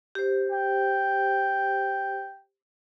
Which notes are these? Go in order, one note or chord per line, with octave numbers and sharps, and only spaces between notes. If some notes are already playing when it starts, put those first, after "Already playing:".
G4 C5
G5